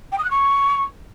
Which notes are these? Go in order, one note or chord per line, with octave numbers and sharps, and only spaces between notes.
G5
D#6
F#6
C#6